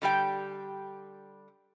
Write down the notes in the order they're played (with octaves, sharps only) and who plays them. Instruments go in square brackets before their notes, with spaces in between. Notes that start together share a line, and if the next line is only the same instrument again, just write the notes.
[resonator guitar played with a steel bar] D3 G3 G4 G5